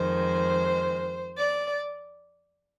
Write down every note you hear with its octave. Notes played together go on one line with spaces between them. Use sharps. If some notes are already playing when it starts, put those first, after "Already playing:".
Already playing: F2 D#3 G#3 C5
D5